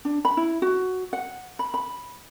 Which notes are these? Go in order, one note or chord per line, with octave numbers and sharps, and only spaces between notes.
D4
B5
E4
F#4
F#5
B5
B5